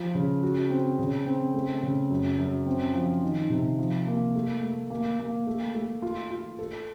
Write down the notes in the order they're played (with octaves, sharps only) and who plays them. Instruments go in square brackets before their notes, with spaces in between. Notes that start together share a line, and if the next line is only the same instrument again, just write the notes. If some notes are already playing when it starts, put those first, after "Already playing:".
Already playing: [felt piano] F3
C#3
F#4
C4
C#3
C4
A3
C#3
F#2
F#2
C4
F3
D#3
C3
F3
A#3
A3
A3
A#3
A#3
A3
A3
F4
F4
A4